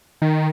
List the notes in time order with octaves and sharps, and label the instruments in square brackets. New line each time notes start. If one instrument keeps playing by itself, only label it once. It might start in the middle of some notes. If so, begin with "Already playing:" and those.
[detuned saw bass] D#3